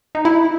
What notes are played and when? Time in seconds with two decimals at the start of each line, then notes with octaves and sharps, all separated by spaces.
0.15 D#4
0.25 E4